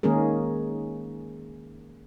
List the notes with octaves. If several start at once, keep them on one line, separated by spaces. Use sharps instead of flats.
D#3 G#3 A#3 C#4 G#4 A#4